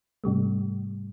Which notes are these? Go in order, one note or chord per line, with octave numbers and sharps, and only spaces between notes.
G#2 C3 G3 A3